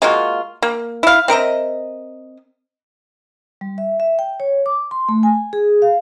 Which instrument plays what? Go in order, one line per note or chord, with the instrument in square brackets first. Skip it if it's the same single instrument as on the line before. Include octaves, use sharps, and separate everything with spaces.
[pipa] G#3 A#3 F4 F#4
A#3
E4 F5
C4 A#4 D#5 E5
[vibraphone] G3
E5
E5
G5
C#5
D6
C6
A3
G#5
G#4
F5